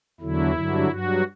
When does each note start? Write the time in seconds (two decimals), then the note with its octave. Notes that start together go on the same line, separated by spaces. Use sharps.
0.21 E2 D3 F#3 E4
0.54 G2 D3 F#3
0.88 G2 F#3 F#4